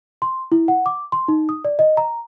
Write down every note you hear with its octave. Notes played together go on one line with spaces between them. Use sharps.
C6
E4
F#5
D6
C6
D#4
D#6
D5
D#5
A#5